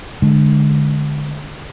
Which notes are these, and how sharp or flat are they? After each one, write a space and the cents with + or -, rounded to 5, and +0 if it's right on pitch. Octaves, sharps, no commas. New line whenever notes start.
D3 +0 G#3 +10